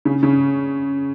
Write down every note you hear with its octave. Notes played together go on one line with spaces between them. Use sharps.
C#3
C#3